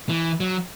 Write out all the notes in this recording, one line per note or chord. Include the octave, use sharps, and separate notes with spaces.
E3
F#3